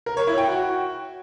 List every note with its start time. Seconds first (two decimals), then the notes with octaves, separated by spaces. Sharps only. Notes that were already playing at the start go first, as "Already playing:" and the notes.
0.06 A#4
0.17 C#5
0.27 E4
0.38 G5
0.48 F#4